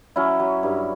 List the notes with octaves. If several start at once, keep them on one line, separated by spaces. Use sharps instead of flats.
F#3 C#4 E4
F#3
G2